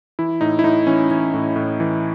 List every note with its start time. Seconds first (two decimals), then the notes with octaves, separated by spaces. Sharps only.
0.19 E3 E4
0.41 A2 D#4
0.59 E4
0.64 A2 D#4
0.87 E3 C#4
1.11 E3 C#4
1.34 A2
1.56 A2
1.80 E3